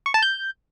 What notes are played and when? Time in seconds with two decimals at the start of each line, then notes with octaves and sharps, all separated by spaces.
0.06 C#6
0.14 A5
0.23 G6